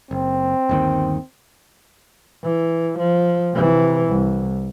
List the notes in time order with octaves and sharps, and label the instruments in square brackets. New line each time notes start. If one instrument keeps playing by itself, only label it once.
[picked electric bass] F#1 [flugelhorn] C4
[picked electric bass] G1 D#2 D#3
[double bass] E3
F3
C3 E3
C2